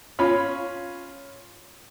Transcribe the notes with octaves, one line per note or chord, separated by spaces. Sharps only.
C#4 F4 C#5 B5